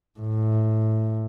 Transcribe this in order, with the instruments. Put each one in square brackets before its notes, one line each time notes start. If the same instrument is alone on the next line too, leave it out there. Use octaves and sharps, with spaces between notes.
[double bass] A2